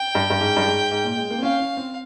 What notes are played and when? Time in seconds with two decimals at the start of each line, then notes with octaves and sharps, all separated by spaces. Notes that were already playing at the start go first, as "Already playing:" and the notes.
Already playing: G5
0.15 G2
0.30 G2
0.41 G#2
0.56 G2
0.66 G#2
0.91 G#2
1.05 A#2
1.17 G#3
1.30 A#3
1.38 C4
1.42 C#4 F5
1.60 C#4
1.77 C4